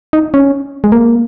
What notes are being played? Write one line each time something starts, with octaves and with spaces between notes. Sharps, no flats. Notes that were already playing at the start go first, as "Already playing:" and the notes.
D#4
C#4
G#3
A#3